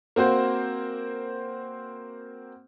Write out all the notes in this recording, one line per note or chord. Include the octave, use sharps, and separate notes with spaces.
A#3 C4 F#4 C5